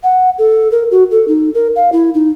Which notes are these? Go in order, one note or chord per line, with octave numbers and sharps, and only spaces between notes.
F#5
A4
A#4
F#4
A4
D#4
A#4
F5
E4
D#4